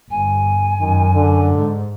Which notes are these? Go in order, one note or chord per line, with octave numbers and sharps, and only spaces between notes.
G1 G#5
F#2 D#3
D3
G#2